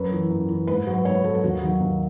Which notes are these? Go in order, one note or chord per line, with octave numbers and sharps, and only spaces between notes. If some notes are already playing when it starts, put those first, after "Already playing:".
Already playing: F#2 B4
E3
F#2
E3
G#2 B4
F#3
B4
G#2 C#5
B4
F#3 A4
A4
D#2 F#4
D#3 F#3
D#2